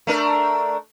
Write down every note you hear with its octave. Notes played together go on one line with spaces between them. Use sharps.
A3 D4 A#4